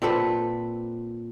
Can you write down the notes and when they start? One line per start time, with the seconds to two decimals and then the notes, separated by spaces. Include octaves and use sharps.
0.02 A#2 C4 A4 B4